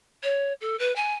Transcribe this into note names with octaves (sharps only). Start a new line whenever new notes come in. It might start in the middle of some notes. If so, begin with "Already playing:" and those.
C#5
A4
B4
G#5